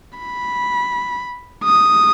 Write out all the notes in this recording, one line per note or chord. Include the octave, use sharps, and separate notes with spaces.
B5
D#6